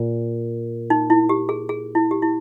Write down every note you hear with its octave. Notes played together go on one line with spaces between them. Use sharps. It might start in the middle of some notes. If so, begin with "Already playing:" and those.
Already playing: A#2
D#4
E4
G4
G#4
G#4
E4
G4
E4